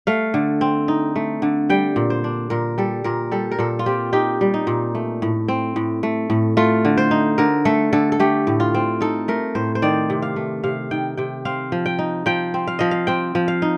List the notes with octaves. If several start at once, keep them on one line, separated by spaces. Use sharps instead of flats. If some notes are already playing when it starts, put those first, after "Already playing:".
A3 F5
D3
C4
D#4
A3
D3
G3 G5
A#2
C5
D4
A#2 A#4
G3 A4
A#2 A#4
G3 A4
A#4
A#2 A4
F4
C4 G4
D#4 G4
G3
D#4
A#2
A3
A2
C4
A2
A3
A2
A3 F4
D3
C5
D#4
D3 A#4
A3 A4
D3 A4
A4
A3 G4
A2
F4
C4
D#4 A4
A3 A#4
A2 C5
C5
D#3 D5
C3
F5
A3
C3 F5
D#3 G5
C3 G5
C4 F5
F3
G5
D#4
F3 G5
C4
F5
F3 D#5
F5
C4 G5
F3
F5
D#4